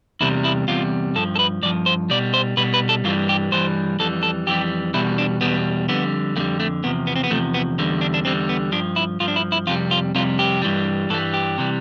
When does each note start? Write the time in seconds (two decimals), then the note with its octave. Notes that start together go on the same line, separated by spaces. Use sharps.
0.21 E2 C3 G3 E4
0.44 E4
0.68 E2 C3 G3 F4
1.15 G2 F3 A4
1.36 A4
1.39 B4
1.63 G2 F3 D5
1.86 C5
2.10 B2 G3 D5
2.34 C5
2.57 B2 G3 B4
2.74 B4
2.89 A4
3.04 G2 E3 G3 F4
3.29 G4
3.52 G2 E3 G3 C5
3.99 F2 E3 G3 A4
4.23 A4
4.47 F2 E3 G3 G4
4.94 E2 B2 G3 E4
5.18 D4
5.41 E2 B2 G3 B3
5.88 F2 D3 G3 B3
6.36 F2 D3 G3 A3
6.60 A3
6.84 E2 C3 F3 B3
7.07 B3
7.16 C4
7.24 B3
7.30 E2 C3 F3 A3
7.54 B3
7.79 E2 D3 G3
8.01 D4
8.14 D4
8.25 E2 D3 G3 C4
8.49 B3
8.72 G2 F3 D4
8.96 E4
9.20 G2 F3 F4
9.28 D4
9.36 E4
9.52 E4
9.67 F2 C3 G3 F4
9.91 F4
10.15 F2 C3 G3 F4
10.39 G4
10.62 G2 E3 G3
11.10 G2 E3 G3 A4
11.34 G4
11.58 C3 E3 G3